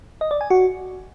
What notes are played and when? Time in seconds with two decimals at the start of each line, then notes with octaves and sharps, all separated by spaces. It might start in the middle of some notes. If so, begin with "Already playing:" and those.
0.21 D#5
0.31 D5
0.41 G#5
0.50 F#4